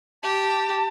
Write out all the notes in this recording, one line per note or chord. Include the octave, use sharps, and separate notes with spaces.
G4 A5